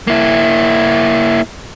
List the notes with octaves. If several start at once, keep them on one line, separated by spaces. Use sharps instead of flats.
A#3 E4